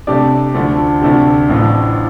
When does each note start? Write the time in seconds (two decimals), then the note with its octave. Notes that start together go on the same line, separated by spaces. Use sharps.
0.07 C3 A3 D4 G4 D5
0.54 D2 D3 F3 A3 D4
1.02 D2 C3 A3 D4 G4
1.49 A1 A2 F3 D4 F4